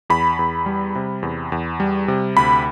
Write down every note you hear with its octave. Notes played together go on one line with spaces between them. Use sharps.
E2 B5
E2
G3
C3
E2
E2
G3
C3
D2 B5